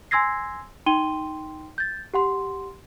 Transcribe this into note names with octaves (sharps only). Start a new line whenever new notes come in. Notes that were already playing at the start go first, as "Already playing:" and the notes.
G#5 C6 E6 G#6 A#6 C7
D#4 G5 C6 D#7 G7
G6 A6
G4 F#5 C6